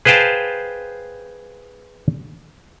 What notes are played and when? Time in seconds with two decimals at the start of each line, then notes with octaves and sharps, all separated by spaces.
0.05 G#4 B4 C5 F5 G5 A5